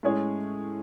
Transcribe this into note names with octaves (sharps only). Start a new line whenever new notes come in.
A2 G#3 C#4 G#4 C#5